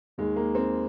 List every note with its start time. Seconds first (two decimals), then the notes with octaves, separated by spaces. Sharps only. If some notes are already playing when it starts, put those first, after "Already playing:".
0.18 D#2 D#3 G#3
0.36 A#3
0.55 C4